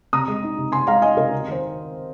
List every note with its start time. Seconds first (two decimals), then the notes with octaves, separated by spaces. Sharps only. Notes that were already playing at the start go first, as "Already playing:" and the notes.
0.13 C3 A#5 D#6
0.28 G#3
0.43 D#4
0.57 C3
0.72 C3 G#5 C6
0.87 G#3 F5 A#5
1.02 D#4 D#5 G#5
1.17 C3 A#4 D#5
1.32 C3
1.48 D#3 C5